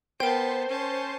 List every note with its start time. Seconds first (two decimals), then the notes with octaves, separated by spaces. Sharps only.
0.20 B3 A#4 C5 G5 A5
0.69 C#4 A5